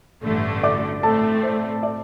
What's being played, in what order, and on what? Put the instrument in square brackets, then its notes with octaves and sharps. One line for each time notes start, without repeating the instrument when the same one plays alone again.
[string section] A1 G2 D3 A3
[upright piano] D5 D6
[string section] A2 A3 C4 [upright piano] A4 A5
[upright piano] C5
D5